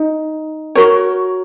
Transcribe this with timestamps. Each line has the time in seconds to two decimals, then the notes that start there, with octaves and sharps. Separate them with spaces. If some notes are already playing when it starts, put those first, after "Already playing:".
Already playing: D#4
0.75 F#4 A#4 C#5